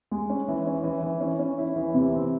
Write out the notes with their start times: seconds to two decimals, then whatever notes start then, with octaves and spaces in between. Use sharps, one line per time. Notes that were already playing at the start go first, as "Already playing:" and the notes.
0.11 G#3
0.30 C#4
0.48 E3
0.66 C#4
0.84 E3
1.03 E3
1.20 C#4
1.39 C#4
1.58 E4
1.76 E3
1.94 C3
2.13 C4